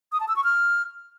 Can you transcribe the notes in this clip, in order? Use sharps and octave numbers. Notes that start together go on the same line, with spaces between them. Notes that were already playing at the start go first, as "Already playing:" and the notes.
D#6
A5
E6
C#6
F6